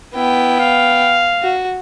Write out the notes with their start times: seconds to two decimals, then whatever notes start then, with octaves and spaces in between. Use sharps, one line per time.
0.15 B3 E4 G5
0.59 F5
1.42 F#4